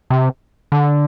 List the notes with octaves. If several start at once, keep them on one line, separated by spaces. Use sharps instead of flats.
C3
D3